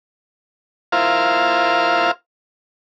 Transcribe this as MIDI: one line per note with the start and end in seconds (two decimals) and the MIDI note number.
0.92 2.11 64
0.92 2.11 65
0.92 2.11 70
0.92 2.11 72
0.92 2.11 77